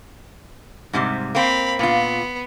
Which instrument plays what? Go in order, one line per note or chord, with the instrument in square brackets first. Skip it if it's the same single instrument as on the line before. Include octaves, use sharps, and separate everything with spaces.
[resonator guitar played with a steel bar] G#2 C3 G3
[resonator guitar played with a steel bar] A#3 C4 [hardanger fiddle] F5 B5
[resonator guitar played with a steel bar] A#2 F4 [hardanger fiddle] B3